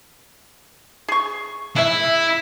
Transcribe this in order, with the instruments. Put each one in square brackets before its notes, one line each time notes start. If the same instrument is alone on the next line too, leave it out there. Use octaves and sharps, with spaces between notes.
[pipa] G#4 C#6
[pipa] G#3 E5 [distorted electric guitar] E4